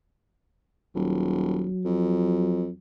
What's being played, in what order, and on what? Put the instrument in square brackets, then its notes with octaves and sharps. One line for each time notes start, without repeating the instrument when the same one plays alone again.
[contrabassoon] D#1 [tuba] F#3
[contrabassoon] F2